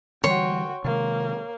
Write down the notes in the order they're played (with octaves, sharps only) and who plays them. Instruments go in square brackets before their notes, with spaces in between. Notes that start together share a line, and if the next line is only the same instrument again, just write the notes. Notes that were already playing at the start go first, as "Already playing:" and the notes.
[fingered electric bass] D3 E3 G3 [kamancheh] F#4 G5 [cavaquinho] C#5 C6
[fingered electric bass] C3 D#3 G#3 [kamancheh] A#3